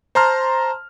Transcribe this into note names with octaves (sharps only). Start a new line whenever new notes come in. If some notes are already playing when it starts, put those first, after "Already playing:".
C5 A5 A#5 C6 F6